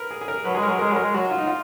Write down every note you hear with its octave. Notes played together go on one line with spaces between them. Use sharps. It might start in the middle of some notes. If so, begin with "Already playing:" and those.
Already playing: A#4 B4
G#4
G#4
A#4
F#3 B4
G#4
G#3
A#4
F#3
G#3 A#4
F#3 A#4
G#3
F#3 F#4
F4
D#4
F4